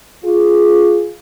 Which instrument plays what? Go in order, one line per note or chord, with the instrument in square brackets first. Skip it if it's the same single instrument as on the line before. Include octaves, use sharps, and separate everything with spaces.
[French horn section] F4 G#4